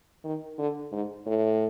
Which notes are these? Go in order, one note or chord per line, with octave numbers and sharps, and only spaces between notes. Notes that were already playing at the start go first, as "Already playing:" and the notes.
D#3
D3
G#2
A2